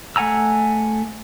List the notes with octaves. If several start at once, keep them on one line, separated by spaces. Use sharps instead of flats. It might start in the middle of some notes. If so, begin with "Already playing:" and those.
A3 F#5 G#5 A#5 E6